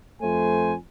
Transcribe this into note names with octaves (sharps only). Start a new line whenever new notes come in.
F2 A3 C5 G#5